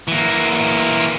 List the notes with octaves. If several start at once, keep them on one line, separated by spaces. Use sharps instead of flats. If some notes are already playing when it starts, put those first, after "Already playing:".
E3 A#3